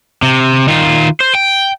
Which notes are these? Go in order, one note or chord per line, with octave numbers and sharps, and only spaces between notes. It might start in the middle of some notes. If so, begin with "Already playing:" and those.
C3
D#3 F4
C5
G5